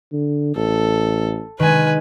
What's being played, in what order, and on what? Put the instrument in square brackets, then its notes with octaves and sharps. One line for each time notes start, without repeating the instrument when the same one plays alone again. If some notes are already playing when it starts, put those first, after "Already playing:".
[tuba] D3
[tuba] A1 [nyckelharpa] A4
[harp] D#3 G#3 [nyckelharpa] B4 G#5